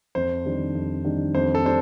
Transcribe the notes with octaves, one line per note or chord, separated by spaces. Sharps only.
F2 C5
D#3 G3 D4
F2
D#3 G3 D4
F2 C5
A4
G3 D4 C5